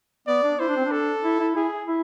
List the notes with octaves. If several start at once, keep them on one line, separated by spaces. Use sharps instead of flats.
B3 D5
D4
E4 C5
D4
C4
D4
A4
E4
E4
E4 G#4
E4